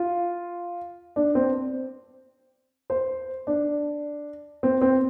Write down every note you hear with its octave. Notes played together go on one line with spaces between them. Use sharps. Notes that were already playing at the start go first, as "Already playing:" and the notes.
Already playing: F4
D4
C4
C5
D4
C4
C4